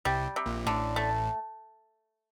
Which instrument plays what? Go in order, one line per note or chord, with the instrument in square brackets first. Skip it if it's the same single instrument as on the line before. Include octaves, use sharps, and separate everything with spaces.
[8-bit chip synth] C2 C3 [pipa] G3
[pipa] C3
[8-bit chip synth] A#1 A#2
[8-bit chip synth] A1 A2 [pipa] D3
[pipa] A3